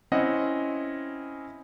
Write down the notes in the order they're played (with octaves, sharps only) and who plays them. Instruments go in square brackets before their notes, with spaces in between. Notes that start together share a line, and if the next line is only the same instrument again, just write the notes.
[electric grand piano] C4 C#4 E4 D#5 F#5